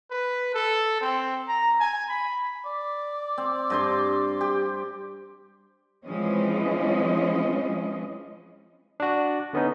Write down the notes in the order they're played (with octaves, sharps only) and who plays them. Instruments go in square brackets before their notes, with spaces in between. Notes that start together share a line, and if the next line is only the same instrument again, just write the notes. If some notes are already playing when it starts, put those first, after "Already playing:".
[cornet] B4
A4
C4
A#5
G#5
B5
[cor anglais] D5
[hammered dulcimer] C4
G2 C5 C6
G4
[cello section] E3 F3 G#3 C4 C#4 D#5
[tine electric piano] D4 F#4
D3 B3 C#4 D#4